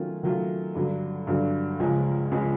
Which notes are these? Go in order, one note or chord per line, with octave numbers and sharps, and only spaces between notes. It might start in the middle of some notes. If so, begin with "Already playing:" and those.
Already playing: D#3 F#3 A3 C#4 F4
D#3 F#3 A3 C#4 F4
G2 D3 F#3
G2 D3 F#3
C#2 C#3 F3 G#3 C#4
C#2 C#3 F3 G#3 C#4